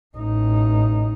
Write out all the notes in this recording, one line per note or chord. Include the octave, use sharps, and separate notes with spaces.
A1 D#4